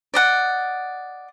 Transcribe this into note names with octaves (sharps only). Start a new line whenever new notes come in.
D5 D#5 F#5